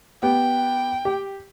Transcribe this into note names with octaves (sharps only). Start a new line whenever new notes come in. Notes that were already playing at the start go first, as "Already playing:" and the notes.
B3 G4 G5
G4